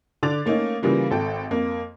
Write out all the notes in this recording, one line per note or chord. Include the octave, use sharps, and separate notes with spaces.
D3 D4 D6 A6 F7
A3 A#3 C#4 D#4
C#3 E3 G3 A#3 F4
G#1 A4 G5
F2 A#3